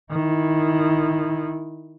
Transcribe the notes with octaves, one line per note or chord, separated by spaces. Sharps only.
D#3 E4